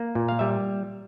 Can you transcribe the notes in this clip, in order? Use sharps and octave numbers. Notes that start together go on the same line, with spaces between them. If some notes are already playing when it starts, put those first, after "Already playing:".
Already playing: A#3
A#2
F5
G3 E5